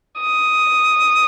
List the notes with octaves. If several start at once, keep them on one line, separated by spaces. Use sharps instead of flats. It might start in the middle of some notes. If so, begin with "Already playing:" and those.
D#6